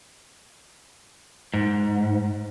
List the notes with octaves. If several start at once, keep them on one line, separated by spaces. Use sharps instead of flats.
G#2